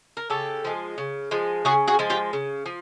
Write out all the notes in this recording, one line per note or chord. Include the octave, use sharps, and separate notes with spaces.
A#4
C#3 G4 A4
F3 G#3
C#3
F3 G#3
C#3 F#4 G#4
F#4 G#4
F3 G#3
F4 G4
C#3
F3